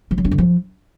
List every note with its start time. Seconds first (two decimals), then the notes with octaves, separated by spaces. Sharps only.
0.11 F3
0.18 F#3
0.25 D4
0.31 D3
0.38 F3